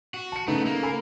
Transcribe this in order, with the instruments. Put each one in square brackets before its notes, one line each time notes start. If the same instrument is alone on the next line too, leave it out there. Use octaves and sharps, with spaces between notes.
[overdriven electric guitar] F#4
[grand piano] A5 C#7
[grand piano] C#3 D#4 B4 [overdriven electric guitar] A3 B3
[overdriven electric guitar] A#3
[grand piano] A4 G#5 B5